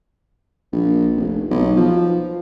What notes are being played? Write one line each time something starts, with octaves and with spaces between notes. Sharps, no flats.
A#1
F1
B1
F3